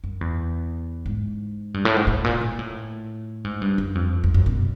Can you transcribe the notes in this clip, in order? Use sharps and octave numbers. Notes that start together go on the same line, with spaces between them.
F#2
E2
G#2
G2
A2
G#2
A2
A#2
A#2
A2
G#2
G2
F#2
F2
F2
F#2
B2